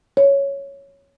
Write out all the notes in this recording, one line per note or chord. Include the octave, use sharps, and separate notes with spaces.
C#5